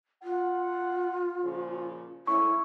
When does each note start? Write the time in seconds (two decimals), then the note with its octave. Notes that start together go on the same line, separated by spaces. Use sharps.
0.23 F4 F#5
1.44 A#2 C#3 F3
2.27 G#2 A3 C#4 E4 C#6